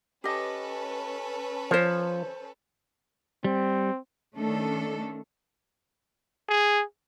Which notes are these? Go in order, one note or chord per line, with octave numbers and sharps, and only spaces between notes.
C#4 G4 A4 B4 D#5
F3 C5 C#5
G3 C4
D#3 A3 C#4 D4 A4
G#4